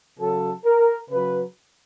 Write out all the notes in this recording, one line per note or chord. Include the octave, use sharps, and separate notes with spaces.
C#3 F#3 A4
A#4
C#3 F#3 B4